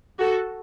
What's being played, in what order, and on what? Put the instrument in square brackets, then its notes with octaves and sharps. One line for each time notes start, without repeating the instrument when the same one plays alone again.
[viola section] F#4 A4